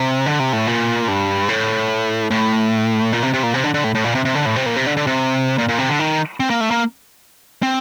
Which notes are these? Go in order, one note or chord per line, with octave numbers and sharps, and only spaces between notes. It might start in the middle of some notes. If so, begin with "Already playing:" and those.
Already playing: C3
D3
C3
A2
A#2
G2
A2
A2
A#2
C3
C3
A#2
C3
D3
D3
A2
A2
A#2
C3
C3
D3
A2
C3
A#2
C3
D3
D3
C3
A#2
A#2
C3
D3
D#3
C4
A#3
A3
A#3
C4